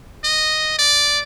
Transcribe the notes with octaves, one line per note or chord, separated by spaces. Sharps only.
D#5
D5